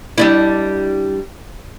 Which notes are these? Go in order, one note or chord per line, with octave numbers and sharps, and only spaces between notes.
G3 D4 E4